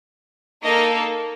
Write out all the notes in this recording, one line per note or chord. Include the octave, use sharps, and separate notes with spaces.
A#3 D#4 A4 D#5